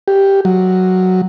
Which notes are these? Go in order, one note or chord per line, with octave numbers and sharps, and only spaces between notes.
G4
F#3